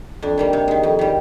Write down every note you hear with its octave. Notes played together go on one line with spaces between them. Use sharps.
F2 D4
D#3 G3 A#3
C3
D#3 G#3
F2
D#3 G3